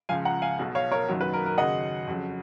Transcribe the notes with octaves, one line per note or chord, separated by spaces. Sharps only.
C#2 C#3 F3 F5 G#5
F#5 A#5
F5 G#5
B1 B2 F#3
C#5 F5
A#4 C#5
F#1 F#2 D#3 F#3
B4
A#4
A#4
D#2 C#3 F#3 D#5 F#5
F2 C#3 F#3